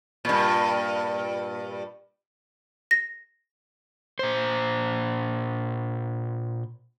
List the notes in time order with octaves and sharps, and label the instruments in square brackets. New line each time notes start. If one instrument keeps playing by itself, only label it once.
[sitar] G2 A#2
[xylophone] A#6
[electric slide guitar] A#2 C5